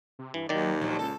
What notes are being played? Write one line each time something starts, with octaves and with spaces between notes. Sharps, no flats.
C3
G2 E3
D#2 D#3 F#3 D5
G2 A#2 F3 F#3
C#2 A4